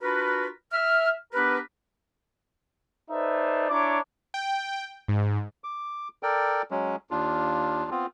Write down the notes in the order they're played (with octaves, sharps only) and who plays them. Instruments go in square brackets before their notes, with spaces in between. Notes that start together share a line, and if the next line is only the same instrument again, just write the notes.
[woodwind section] D4 F4 F#4 A#4 B4
E5 F6
B3 D4 G4 A#4 B4
[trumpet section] D#4 A4 B4 C5 D5 E5
D4 E4 C#5 A#5 D6
[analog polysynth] G5
G#2
[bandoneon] D6
A4 A#4 D5 G5
F#3 G#3 C#4
D#2 D4 F4
B3 C4 F4